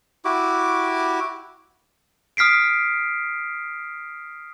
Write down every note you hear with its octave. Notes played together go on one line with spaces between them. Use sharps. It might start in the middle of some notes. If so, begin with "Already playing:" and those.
E4 F#4 G4 D6
D#6 F6 B6 C7 D7